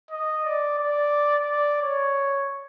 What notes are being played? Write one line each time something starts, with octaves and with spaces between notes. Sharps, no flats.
D#5
D5
D5
D5
C#5